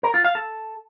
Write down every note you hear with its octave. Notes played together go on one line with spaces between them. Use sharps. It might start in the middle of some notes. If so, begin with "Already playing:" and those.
A#4
F4
F5
A4